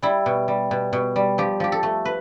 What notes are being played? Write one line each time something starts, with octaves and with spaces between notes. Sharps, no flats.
G3 E4
B2
G3
B2
B2
G3
F3 G4
F3 G4
A4
A3
B4